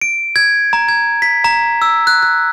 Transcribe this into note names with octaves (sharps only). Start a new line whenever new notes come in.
D7
G#6
A#5
G#6
B6
A#5
E6
F#6
F#6